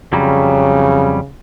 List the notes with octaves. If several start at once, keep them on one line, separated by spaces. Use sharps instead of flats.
F2 C#3 F#3 G3